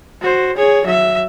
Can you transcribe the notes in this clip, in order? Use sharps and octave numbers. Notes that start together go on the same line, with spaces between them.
F#4 C5
G#4 C#5
F#3 E5